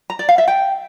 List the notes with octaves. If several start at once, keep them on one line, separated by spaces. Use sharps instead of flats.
A#5
D5
F5
E5
G5